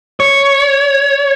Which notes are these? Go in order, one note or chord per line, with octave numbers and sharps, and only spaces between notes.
C#5